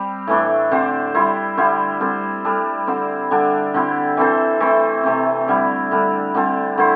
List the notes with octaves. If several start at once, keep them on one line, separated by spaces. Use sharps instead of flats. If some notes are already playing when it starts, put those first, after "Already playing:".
Already playing: G3 C4 G4
A2 E3 A3 D4
D3 C4 G4 C5
G3 E4 C5
D3 G3 E4 C5
G3 C4 A4 C5
G3 D4 A4
D3 C4 E4 C5
D3 G3 D4 A4
D3 C4 E4 G4
E3 C4 A4 C5
E3 A3 C4
C3 A3 C4
D3 G3 E4
D3 G3 D4 A4
D3 G3 C4 A4
D3 A3 E4 C5